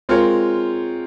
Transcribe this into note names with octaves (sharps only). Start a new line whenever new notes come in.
G#3 C4 F4 A#4 C#5